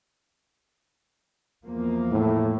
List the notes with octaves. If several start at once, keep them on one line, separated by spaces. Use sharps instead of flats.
E2 F3 A#3
A2